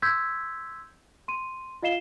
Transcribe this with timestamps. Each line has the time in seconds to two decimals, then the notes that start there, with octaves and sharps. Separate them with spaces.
0.02 C6 E6 G6 G#6 B6
1.28 C6 D#7
1.82 F4 D#5 F5 C7 E7 G7